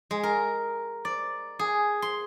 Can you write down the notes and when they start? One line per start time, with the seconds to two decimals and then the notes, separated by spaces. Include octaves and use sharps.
0.11 G#3
0.23 A#4
1.05 D5
1.59 G#4
2.02 C6